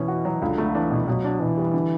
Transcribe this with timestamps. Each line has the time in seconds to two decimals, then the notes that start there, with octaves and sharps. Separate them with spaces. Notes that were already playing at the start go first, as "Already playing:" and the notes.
Already playing: B2 E3 C#4
0.08 F#4
0.25 F#3
0.42 C#2 D3
0.58 A3
0.74 E3 D4
0.91 B2
1.08 B2 F#3
1.25 D4
1.40 B2 E3
1.58 G3
1.74 D3